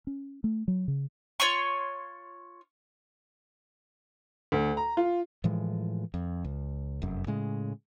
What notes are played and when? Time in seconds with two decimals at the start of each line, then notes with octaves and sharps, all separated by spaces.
0.07 C#4
0.44 A3
0.68 F#3
0.88 C#3
1.40 F4 C#5 C6 C#6
4.52 D2
4.77 A#5
4.97 F4
5.44 A2 E3 F3 G#3
6.14 F2
6.44 C#2
7.02 F1 F#2
7.27 A2 C#3 G#3